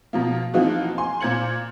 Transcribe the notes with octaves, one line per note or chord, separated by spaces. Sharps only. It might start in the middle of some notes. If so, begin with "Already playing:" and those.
B2 F3 A#3
E3 F3 A#3 C4 D#4 F#4
G#5 C6
A#2 C5 G#6 C#7 F#7